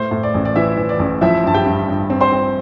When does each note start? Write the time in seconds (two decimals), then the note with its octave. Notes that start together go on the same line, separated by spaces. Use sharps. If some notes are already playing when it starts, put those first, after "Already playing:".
Already playing: A2 C5
0.11 A2
0.23 D5
0.34 A1
0.45 D5
0.56 E3 E4 E5
0.77 E3
0.89 D5
0.99 A1
1.21 F3 E4 E5
1.44 G2 A5
1.54 G4 G5
1.66 G2
1.88 G2
2.10 C4
2.21 C5 C6
2.32 C4